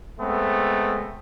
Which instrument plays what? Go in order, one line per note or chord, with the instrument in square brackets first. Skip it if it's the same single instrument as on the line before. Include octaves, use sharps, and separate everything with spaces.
[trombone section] G#3 A3 B3 C4